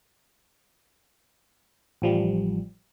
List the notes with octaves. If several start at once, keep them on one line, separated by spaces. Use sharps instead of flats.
A1 F3 G3